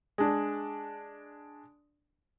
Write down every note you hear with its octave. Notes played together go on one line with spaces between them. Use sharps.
G#3 D4